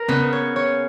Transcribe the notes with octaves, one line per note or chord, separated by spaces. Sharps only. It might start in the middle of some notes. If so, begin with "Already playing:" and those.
Already playing: A#4
C#3 B3
C#5
C#5